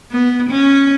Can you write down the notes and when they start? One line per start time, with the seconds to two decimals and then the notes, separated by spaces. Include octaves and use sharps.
0.11 B3
0.50 C#4